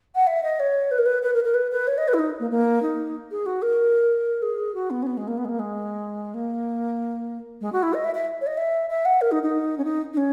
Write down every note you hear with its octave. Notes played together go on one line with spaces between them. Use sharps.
F#5
E5
D#5
C#5
B4
A#4
B4
B4
A#4
A#4
B4
B4
C#5
D#5
B4
E4
D#4
A#3
A#3
D#4
G#4
F#4
A#4
G#4
F#4
B3
C#4
B3
G#3
A#3
B3
G#3
A#3
G#3
A#3
G#3
F#4
E4
D#5
E5
E5
C#5
D#5
E5
E5
F#5
A#4
D#4
D#4
C#4
D#4
D#4
C#4